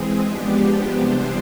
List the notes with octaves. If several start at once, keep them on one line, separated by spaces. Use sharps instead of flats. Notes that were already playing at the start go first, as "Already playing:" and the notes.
Already playing: E3 G#3 C4 G#4
F3 G#3 B3 D4 G4
G4
C3 E3 G3 B3 D4 C5